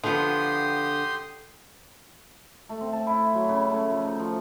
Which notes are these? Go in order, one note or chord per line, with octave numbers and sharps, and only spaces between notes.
D3 F3 B3 G4 C6 D#6
A3
C4
A5
E4
F#3
C#3
A3
F3
D#4
F3